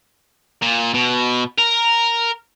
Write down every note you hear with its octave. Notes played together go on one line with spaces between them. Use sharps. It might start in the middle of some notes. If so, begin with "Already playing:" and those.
A#2
B2
A#4